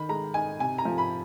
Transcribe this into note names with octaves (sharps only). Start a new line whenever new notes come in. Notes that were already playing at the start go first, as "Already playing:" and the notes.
Already playing: D#3 B5
G#3 A#5
D#4 G#5
C3 G#5
A#5
F3
B5